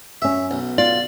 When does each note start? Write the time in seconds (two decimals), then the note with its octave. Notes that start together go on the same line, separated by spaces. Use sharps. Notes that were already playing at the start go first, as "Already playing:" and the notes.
0.22 F#2 C#4 E5
0.51 B1
0.78 F4 D5